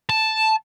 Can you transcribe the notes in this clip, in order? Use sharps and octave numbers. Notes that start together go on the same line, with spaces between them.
A5